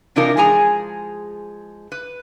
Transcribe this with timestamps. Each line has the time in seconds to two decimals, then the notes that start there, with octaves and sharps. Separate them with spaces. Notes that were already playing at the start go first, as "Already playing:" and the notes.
0.16 C3 E3 D4 D#4 F4 A#4
0.37 F3 G#3 G#4 G#5 A#5
1.92 B4